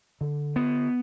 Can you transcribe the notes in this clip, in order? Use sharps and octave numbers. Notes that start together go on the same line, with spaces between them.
D3
B3